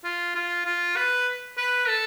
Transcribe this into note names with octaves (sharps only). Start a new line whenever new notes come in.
F4
F4
F4
B4
B4
A4